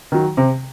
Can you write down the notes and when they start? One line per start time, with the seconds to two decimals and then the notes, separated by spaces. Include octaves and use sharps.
0.12 D#3 F#3
0.37 C3